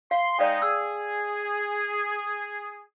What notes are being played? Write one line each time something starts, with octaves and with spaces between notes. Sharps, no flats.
F5 C6
G#3 D#4 D5 F5 G5
G#4 E6